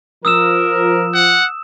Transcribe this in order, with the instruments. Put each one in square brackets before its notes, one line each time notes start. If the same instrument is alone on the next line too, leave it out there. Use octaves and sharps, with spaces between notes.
[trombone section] F3 [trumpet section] A#4 [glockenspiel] D#6 E6 E7
[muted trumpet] F#5